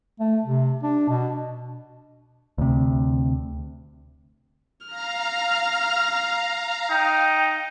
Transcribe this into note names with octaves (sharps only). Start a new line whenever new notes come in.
A3
C3
D4
B2
D2 C3
F5 A#5 F6
D#4 G5